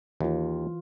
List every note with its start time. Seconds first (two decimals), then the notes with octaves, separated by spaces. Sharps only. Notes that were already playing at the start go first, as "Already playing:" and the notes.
0.21 D#2 E3 F4